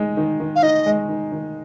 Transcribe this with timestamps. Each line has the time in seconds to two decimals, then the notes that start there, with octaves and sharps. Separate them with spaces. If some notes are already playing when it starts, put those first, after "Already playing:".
Already playing: G#3 D#4
0.17 D#3
0.40 D#3
0.56 F5
0.62 D#4 D#5
0.86 G#3
1.08 D#3
1.32 D#3